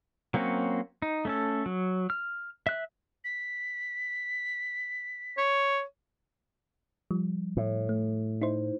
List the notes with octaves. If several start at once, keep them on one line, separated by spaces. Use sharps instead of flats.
F#3 A#3 C4 C#4 F#4
D#4
A3 C#4 A4
F#3
F6
E5 F#6
B6
C#5
F3 G3
A2
A3
D#4 E4 C5